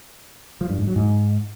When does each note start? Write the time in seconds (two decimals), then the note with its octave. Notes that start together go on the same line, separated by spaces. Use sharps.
0.61 F3
0.70 G2
0.78 G#2
0.87 F#3
0.96 G#2